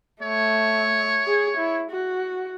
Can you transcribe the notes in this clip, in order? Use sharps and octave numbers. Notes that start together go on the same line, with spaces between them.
A3 C#5
G#4
E4
F#4